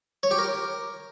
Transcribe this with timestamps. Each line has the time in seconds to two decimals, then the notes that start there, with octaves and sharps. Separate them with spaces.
0.23 C#5
0.31 G4
0.39 A#4